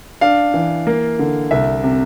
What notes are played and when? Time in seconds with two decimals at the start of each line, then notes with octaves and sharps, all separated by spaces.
0.21 D4 F5
0.54 E3
0.87 A#3
1.19 D3
1.51 C2 E5
1.84 C3